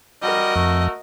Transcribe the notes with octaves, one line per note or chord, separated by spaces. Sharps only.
G3 F#4 A#4 D#5
F2 A3